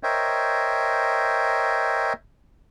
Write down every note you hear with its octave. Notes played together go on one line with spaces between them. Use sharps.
A#4 C5 C#5 D#5 E5 G5